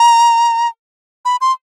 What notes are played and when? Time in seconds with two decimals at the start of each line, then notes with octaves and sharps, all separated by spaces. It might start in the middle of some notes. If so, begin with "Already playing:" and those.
Already playing: A#5
1.25 B5
1.41 C6